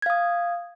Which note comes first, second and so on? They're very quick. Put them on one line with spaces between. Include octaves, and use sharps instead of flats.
G#6 F5 D#6